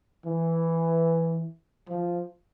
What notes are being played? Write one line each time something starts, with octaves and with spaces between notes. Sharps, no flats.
E3
F3